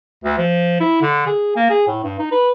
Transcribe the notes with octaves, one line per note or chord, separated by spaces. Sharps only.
D2
F3
E4
D3
G#4
A#3
G#4
A2
G2
D#4
B4